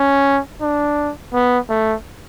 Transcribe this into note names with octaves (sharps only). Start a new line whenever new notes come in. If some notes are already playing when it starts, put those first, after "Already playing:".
Already playing: C#4
D4
B3
A3